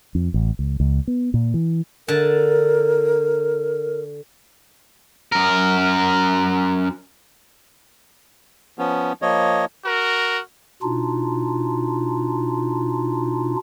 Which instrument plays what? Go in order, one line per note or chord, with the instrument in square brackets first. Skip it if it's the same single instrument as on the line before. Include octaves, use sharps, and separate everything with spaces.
[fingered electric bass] F2
A1
C#2
C#2
B3
A#2
E3
[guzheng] D3 A5 [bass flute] A#4
[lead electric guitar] F#2 A#4
[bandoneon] F3 B3 C#4
F3 A#3 C#5 D#5
[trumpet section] F#4 A#4
[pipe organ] B2 D4 D#4 F4